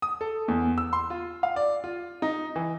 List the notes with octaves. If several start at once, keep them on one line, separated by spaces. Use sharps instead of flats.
D#6
A4
E2
E6
C6
F4
F5
D5
F4
D#4
E3